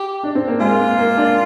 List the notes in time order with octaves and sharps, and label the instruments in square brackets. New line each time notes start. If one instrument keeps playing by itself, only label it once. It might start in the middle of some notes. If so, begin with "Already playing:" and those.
Already playing: [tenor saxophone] G4
[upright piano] D4
C4
A#3
[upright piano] G#3 [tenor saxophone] F4
[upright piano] A#3
A#3
D4